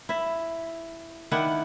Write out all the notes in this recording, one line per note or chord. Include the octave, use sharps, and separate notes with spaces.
E4 E5
D#3 D4 E4 F#5